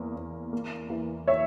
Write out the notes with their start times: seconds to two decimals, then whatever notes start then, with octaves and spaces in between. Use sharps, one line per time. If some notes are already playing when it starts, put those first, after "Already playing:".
Already playing: E2 A#3
0.16 E2
0.53 A#3
0.90 E3
1.27 C#5 E5